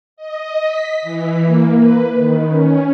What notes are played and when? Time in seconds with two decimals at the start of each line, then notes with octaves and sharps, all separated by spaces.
0.17 D#5
0.65 B6
1.02 E3
1.46 A#3
1.76 B4
2.14 D#3
2.48 C#4